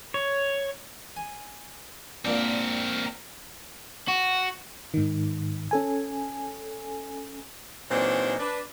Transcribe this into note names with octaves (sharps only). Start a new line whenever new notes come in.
C#5
G#5
A#2 C4 D4 A#4
F#4
G#2 D#3
C#4 A4 G#5
A#2 E3 F#3 C4 D4 D#4
D4 B4